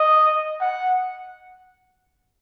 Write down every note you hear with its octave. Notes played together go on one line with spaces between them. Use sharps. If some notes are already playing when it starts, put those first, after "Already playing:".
Already playing: D#5
F#5